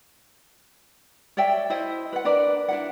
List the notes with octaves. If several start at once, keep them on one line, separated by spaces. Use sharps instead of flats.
C#5 D5 E5 G5
E4 C5 D#5 E5
B4 F#5
D4 A#4 B4 D5
D4 E4 F#5